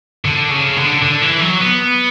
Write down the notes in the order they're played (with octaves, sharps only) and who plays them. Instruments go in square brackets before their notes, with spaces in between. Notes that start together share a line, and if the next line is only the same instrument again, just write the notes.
[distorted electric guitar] D3
C#3
D3
D3
E3
F#3
B3